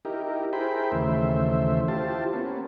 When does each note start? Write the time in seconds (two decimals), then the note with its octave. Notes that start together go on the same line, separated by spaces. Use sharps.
0.05 D#4 E4 G4 A#4
0.53 E4 G#4 A#4 C5 G5 B5
0.92 D#2 C#3 E3 A3 C5 E5
1.88 E4 F4 G4 C5 A5
2.33 A#3 B3 C#4